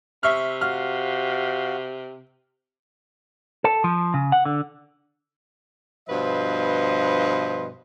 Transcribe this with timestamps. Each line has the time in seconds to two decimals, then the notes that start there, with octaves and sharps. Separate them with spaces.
0.23 C3 E5 C#6 F6
0.61 F#4 F5 F6
3.64 A4
3.84 F3
4.14 C#3
4.32 F#5
4.45 D3
6.08 G2 B2 F3 B4 C5 D#5